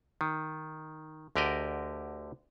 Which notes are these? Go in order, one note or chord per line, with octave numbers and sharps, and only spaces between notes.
D#3
D2 D3 G4 A#4 D5 D#5